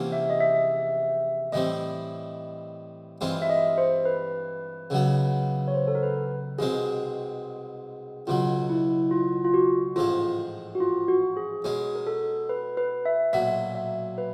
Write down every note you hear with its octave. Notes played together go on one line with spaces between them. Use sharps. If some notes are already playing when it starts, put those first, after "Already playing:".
Already playing: E2 C3 F3 A#3 C#4
E5
D#5
E5
A2 E3 G3 C4 D#5
G2 E3 G#3 C4 F4
E5
D#5
C5
B4
C#2 C#3 F#3 B3
C#5
C5
A4
A#4
B4
C2 B2 G#3 C4 G#4
C#2 B2 F#3 F4
E4
F4
F4
F#4
A1 G#2 F3 G#3 F4
F#4
F4
F#4
G#4
B2 G#3 C#4 G#4
A#4
A4
B4
B4
E5
B1 A#2 F#3 E5
E5
B4